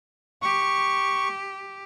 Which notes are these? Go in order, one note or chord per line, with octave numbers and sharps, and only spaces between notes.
G4 C#6